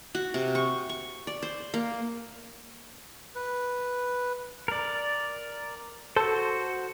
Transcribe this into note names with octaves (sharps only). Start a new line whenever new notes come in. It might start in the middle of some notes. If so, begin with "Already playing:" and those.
F#4
C3
C#6
C#6
D5
C5
A#3
B4
A#4 D5
F#4 A4 C5